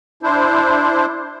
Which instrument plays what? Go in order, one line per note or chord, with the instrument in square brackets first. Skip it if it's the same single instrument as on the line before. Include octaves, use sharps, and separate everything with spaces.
[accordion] D4 E4 C5